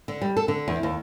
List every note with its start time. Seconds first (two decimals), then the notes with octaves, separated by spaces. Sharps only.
0.08 D3
0.22 G3
0.37 A4
0.48 D3
0.68 E2
0.83 D#2